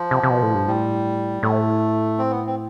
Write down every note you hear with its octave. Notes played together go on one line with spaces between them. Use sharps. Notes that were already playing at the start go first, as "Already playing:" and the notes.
Already playing: F3
C3
C3
B2
A2
G2
A2 G3
A2 A3
C4
B3
C4